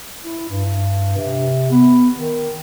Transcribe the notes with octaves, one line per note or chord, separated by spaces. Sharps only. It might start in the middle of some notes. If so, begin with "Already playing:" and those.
E4
G2
C3
B3
D#3